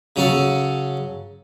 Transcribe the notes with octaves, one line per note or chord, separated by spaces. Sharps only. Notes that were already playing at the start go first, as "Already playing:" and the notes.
C#3 F#3 C#4 A4